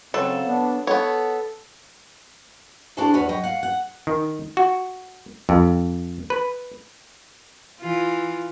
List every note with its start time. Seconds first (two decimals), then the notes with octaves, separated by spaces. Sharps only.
0.14 C#3 F#3 C4 A4
0.45 B3 D4
0.87 B3 A4 C#5
2.97 D4 E4 F#4 G#4 A4 C5
3.14 E2 G#3 F#4 B4 C#5
3.29 F#3 D#5 G5
3.44 F5 F#5
3.63 F#5
4.07 D#3
4.57 F#4
5.49 F2
6.30 B4
7.81 E3 F4